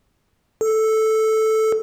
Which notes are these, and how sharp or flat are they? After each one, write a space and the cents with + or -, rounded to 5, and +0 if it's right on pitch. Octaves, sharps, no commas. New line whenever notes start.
A4 -5